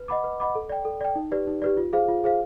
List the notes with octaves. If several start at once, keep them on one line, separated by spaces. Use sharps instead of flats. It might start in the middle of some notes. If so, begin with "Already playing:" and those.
Already playing: B4
D#5 F#5 B5 D6
B4
D#5 F#5 B5 D6
A4
D5 G5
A4
D5 G5
D#4
G4 B4 D5
D#4
G4 B4 D5
F4
G#4 C5 F5
F4
G#4 C5 F5